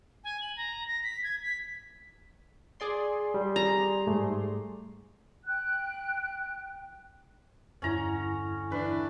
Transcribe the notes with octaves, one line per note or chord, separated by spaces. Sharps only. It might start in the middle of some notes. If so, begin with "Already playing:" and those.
G#5
F#7
A#5
A#6
B6
G#6
B6
G#4 D5 C6
G3
A#5
G#2 A3
G5 F#6
E2 G2 D3 C#4 E4 A#5
E3 D4 B4